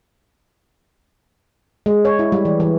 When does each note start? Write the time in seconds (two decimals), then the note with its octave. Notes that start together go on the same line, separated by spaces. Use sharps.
1.86 G#3
2.05 C#5
2.19 E4
2.32 G3
2.45 E3
2.60 E3